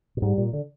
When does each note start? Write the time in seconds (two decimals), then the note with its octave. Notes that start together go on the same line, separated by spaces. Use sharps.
0.17 A#2
0.22 G#2 G3
0.38 A#2
0.53 D3